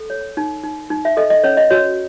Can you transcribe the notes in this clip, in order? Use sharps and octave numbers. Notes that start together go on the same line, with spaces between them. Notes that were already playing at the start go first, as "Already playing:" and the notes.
Already playing: A4
C#5
D#4
D#4
D#4
E5
A4 D#5
D#5
C#4 C#5
D#5
F#4 C#5